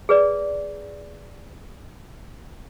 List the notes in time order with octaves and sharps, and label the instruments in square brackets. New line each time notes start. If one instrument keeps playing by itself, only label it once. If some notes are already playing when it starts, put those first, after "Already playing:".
[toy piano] G#4 B4 D5